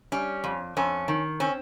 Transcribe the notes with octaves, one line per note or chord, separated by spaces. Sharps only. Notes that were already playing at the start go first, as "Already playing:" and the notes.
G3 C#4
F2
F2 C#4
D#3
C4 C#4